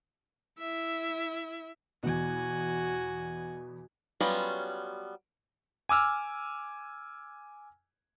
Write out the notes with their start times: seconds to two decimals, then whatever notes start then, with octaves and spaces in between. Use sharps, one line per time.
0.59 E4 E5
2.03 E2 B2 F#4 G#5
4.21 F#3 G3 B3 C#4 F4
5.89 G#5 D6 E6 F6